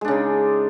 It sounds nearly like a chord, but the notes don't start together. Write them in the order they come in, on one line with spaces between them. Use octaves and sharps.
G#3 D4 C#3 D#4